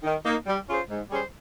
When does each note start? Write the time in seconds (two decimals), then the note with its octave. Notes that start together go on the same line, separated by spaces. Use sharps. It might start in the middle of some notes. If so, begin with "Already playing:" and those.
0.03 D#3
0.25 A#3 D#4
0.46 G3
0.67 C#4 F4 G#4 C5
0.89 G#2
1.10 G3 C#4 G#4 C5